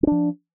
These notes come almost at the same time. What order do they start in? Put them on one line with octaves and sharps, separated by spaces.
C#4 D4 F3